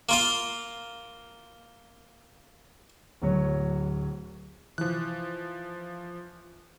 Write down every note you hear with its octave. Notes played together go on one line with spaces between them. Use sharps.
A#3 F4 F5
D1 F#3 C#5
E3 F3 F#6